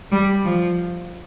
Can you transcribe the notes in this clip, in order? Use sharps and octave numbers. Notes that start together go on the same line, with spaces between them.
G3
F3